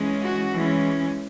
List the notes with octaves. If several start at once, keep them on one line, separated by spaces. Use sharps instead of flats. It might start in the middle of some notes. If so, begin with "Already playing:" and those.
Already playing: E3 G#3 C#4
F#4
E3 G#3 C#4